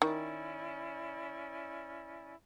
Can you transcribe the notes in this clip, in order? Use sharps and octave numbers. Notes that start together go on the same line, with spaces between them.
D#3 C#4 E4 D5